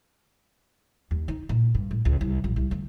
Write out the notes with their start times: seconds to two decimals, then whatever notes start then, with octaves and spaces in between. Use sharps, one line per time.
1.11 D#2
1.28 D#4
1.49 A#2
1.74 G2
1.91 A2
2.05 C#2
2.21 C2
2.44 A#1
2.56 C2
2.71 D2